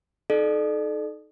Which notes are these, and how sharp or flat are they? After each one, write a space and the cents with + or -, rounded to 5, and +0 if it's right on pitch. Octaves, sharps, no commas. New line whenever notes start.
D#4 +0 A4 -25 D5 +35